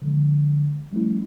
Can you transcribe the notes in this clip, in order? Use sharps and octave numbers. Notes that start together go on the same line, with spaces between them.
D3 F3 G#3
F3 G3 A3 C#4 E4